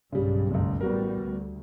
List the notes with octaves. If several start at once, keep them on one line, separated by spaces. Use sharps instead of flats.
B1 G2 C#3 G3
F#1 C#2
A1 G3 B3 F#4 A#4
D2